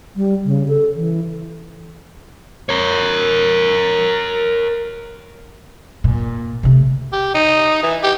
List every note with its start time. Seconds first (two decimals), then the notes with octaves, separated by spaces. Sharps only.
0.16 G3
0.45 C#3
0.68 A4
0.95 E3
2.69 A#4 C#5
6.04 A#2
6.63 C3 A3
7.13 G4
7.34 D#4
7.83 E3
8.03 G4